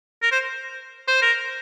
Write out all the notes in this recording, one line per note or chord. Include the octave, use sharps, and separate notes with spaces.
A#4
C5
C5
A#4